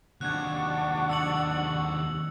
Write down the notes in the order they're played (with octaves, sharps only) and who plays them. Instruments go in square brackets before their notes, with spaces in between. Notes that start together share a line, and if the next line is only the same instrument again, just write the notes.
[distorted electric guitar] D#2 C3 [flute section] D4 F#5 C#6 [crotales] F#6 G#6
[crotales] E6 C#7 F#7